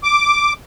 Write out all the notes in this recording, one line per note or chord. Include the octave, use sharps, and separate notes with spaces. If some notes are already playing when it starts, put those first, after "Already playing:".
D6